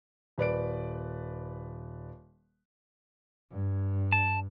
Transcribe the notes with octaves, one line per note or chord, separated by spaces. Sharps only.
D#1 B4 D5 D7
G2
A5